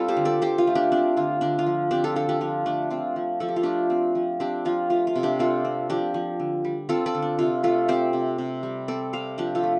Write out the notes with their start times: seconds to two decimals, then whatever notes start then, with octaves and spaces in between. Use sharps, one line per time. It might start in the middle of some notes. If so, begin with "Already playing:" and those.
Already playing: G3 C4 F4 A4
0.08 G4 C5
0.17 D3
0.25 A4 D5
0.41 D3 G4 C5
0.58 F4
0.67 A3
0.75 D4 G4
0.92 C4 D4
1.17 D3 F4
1.41 D3 D4
1.59 F4
1.66 F3
1.91 C4 D4 G4
2.04 F4 A4
2.16 D3 F4 A4
2.29 D4 G4
2.41 F3 F4
2.66 A3 D4
2.90 C4 F4
3.16 F3
3.40 F3 A4
3.49 G4
3.56 F4
3.63 A3 D4 G4
3.90 C4
4.15 F3
4.40 C4 D4 G4
4.65 F3 F4
4.90 A3 F4
5.07 F4
5.16 C3
5.23 D4 G4
5.39 C4 F4 A4
5.65 C4
5.90 F3 D4 G4
6.14 F3
6.40 D3
6.65 G3
6.89 C4 F4 A4
7.06 A4 D5
7.15 D3
7.22 D4
7.39 C3 F4
7.63 A3 F4 A4
7.88 C4 G4 C5
8.13 C3
8.38 C3
8.63 G3
8.88 C4 A4 D5
9.13 C3 C5 F5
9.38 F3 D4 G4
9.55 F4 A4
9.63 A3